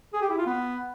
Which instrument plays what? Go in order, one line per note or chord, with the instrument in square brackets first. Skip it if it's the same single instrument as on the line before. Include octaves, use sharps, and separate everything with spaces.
[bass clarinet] G#4
G4
E4
F4
B3